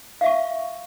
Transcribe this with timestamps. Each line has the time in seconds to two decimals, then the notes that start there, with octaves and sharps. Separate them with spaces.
0.21 F5
0.24 E5
0.26 C#6